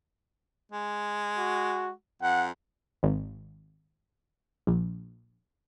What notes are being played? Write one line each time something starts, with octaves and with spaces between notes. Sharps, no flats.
G#3
F#4
F2 F#5
G#1
A#1